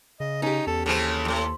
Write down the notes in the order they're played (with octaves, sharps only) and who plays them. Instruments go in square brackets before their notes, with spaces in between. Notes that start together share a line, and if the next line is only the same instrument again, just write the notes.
[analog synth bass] C#3 [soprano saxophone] D#5
[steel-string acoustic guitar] C#4 G4 [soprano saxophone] D#4
[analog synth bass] E2 [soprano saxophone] A4
[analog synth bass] D#2 [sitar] C#3 E3 C4 [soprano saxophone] A4
[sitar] E2 A2